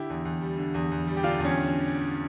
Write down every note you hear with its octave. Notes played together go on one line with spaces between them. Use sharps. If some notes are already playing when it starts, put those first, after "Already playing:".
Already playing: D3 E4 G4
E2
E2
G3
D3
E2
E2
G3
G4
D3 D4 F4
E2
C#4